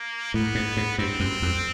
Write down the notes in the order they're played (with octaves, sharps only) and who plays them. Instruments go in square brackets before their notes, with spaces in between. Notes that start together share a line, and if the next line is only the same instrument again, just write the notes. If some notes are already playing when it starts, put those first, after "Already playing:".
Already playing: [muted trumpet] A#3
[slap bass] A2 [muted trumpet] B3
[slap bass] G#2
G#2
[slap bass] G2 [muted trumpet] C4
[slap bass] F#2
F2